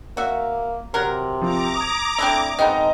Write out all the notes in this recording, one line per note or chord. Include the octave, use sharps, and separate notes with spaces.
A#3 F#4 E5
C3 F#3 A#4
F3 C4 A#5 D6
D#6 G#6
A3 C4 D4 E4
G#2 D#3 B3 C4 D#5 A#5